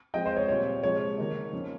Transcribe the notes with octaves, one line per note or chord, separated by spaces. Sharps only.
F3 G#3 C4 D#4 D#5 G5
C5 D#5
C#5
A#2 G3 C4 C#5
C3 F3 G#3 D#4 C#5
D#3 A#3 D#4
F3 A#3 C#4